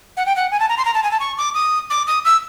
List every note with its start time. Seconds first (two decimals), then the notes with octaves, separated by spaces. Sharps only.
0.17 F#5
0.26 G5
0.36 F#5
0.51 G#5
0.60 A5
0.69 A#5
0.78 C6
0.85 A#5
0.94 A5
1.03 G#5
1.11 A5
1.20 C#6
1.38 D6
1.54 D#6
1.90 D6
2.07 D#6
2.25 E6